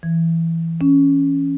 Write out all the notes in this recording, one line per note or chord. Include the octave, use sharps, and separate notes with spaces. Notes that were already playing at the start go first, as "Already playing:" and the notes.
E3
C#4